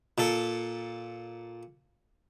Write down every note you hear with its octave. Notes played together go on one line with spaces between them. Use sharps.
A#2 A4